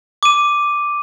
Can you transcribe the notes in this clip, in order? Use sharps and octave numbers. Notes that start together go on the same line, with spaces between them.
D6 D#7